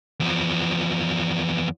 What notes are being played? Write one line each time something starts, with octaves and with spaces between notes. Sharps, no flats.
E2 F3